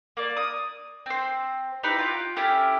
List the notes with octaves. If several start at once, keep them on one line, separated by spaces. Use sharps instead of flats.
A#3 D5
D#6
C4 C5
D#4 E4 G4 B4
F4 G5
C#4 E4 G4 A4